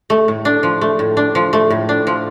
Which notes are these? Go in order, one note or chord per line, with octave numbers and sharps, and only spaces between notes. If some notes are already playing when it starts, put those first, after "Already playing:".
A3
A2
D4
F3
A3
A2
D4
F3
A3
A2
D4
F3